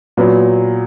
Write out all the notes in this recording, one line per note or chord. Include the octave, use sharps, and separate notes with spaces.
A#2 F#3 B3